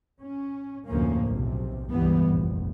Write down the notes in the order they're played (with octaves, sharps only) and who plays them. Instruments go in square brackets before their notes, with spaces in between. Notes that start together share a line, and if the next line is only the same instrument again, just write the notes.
[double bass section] C#4
F1 D2 A2 F3 A#3 C#4
B1 C3
C#2 G2 E3 G3 B3
F1 A#1